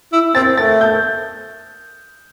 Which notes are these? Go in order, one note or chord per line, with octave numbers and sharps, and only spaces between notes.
E4
C4 A6
A3 A6
G6